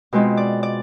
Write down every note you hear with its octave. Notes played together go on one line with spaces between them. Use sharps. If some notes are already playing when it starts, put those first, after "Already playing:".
B2 G#3 C4 F4 B4
D5
D5